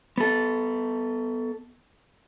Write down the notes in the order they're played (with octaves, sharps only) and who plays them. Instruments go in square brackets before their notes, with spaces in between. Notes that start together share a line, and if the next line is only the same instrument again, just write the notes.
[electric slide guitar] B3 A4